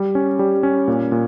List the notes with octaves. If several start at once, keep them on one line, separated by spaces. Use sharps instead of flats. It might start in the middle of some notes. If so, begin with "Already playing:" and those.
Already playing: G3
C#4
G3
C#4
A#2
A#2